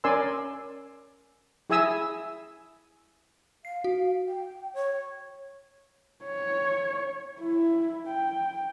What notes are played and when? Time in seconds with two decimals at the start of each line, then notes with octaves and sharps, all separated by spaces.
0.04 C#4 A#4 D5 G#5 C6 E6
1.70 E4 G#4 E5 G#5 D#6 E6
3.65 F5 C7
3.84 F#4
4.27 G5
4.74 C#5
6.24 C#5
7.40 E4
8.07 G5